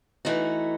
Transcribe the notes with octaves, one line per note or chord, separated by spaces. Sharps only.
E3 A3 D#4 F#4